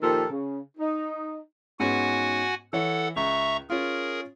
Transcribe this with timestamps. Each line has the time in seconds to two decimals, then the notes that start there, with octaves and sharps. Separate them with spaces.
0.01 A#2 D#3 F3 G4 A4 A#4
0.31 C#3
0.78 D#4
1.80 G#2 B3 C#4 F#4 F#5 G#5
2.73 E3 A4 C#5 F#5
3.16 C#2 E5 A#5 C#6
3.70 C#4 F4 G#4 A#4